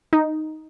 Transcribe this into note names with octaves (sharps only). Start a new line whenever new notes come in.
D#4